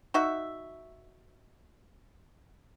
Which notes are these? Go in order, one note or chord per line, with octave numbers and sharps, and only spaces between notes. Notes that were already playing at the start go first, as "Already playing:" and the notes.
D#4 F#4 E5